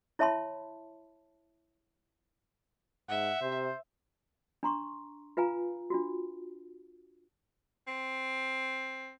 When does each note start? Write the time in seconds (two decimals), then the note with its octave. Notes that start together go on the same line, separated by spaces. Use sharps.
0.19 E4 C#5 E5 A5 B5 C6
3.09 G#2 E5 F#5
3.42 C3 C5
4.63 D4 A#5 C6 C#6
5.37 F4 B4 F5 G#5 A#5
5.90 D4 F4 F#4
7.87 C4